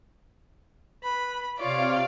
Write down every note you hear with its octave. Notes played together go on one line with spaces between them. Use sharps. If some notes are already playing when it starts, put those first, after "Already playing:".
B4 B5
C3 F4 C#5 D5 F5